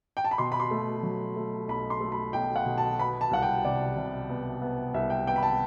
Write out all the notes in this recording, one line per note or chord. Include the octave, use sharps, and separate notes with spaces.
G5
A5
B5
B2 C6
B5
C6
A3
F#3
A3
B1 B5
C6
A3
B5
B1 G5
F#5
B2
A5
B3 B5
A5
C2 F#5
G5
C3 D5
C3
B3
B3
C2 E5
G5
B3 G5
B5
A5